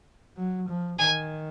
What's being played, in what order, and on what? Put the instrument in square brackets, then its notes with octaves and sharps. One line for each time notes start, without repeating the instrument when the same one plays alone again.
[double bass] F#3
F3
[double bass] D#3 [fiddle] G#5